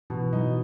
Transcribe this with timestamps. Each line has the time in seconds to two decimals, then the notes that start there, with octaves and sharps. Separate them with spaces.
0.10 B2 E3
0.33 F#3 D#4